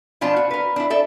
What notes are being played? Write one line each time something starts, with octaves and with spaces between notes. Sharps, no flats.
B2 F3 D4 F4 A5
F#4
A#4 B4
D4 E4
A4 D5 E5